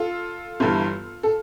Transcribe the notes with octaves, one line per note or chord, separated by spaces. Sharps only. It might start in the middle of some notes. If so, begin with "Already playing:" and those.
Already playing: F4 A4
G1 G2 E3
A4